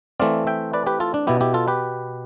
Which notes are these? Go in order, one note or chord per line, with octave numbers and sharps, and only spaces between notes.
E3 A3 C4 D5 F5
E5 G5
B4 D5
G4 B4
F4 A4
D4
B2 B3 E4 G4
E4 G4
F4 A4
G4 B4